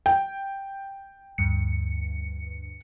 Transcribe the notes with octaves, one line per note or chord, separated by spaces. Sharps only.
G5
D2 G2 C#7